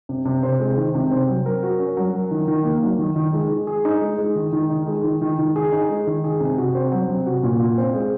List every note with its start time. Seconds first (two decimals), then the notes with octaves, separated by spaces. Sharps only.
0.09 C3
0.25 C3
0.43 C4
0.60 G#3
0.77 D#3
0.94 C3
1.11 C4
1.28 F#3
1.46 A#4
1.63 F#4
1.79 C#4
1.97 F#3
2.13 A#4
2.31 D#3
2.48 D#3
2.65 A#3
2.82 F#3
2.98 D#3
3.16 D#3
3.33 G#3
3.50 G#3
3.67 G#4
3.85 D#4
4.02 G#3
4.18 G#3
4.35 D#3
4.53 D#3
4.70 D#4
4.87 G#3
5.04 D#3
5.22 D#3
5.39 D#3
5.56 G#4
5.72 D#4
5.89 G#3
6.07 D#3
6.24 G#4
6.40 C3
6.58 F#4
6.75 C4
6.92 F#3
7.08 C3
7.26 F#4
7.43 A#2
7.60 F4
7.78 C4
7.94 G#3